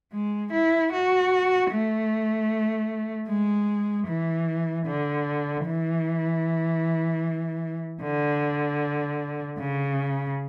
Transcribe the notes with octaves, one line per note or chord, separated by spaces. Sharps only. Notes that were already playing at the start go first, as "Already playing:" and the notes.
G#3
E4
F#4
A3
G#3
E3
D3
E3
D3
C#3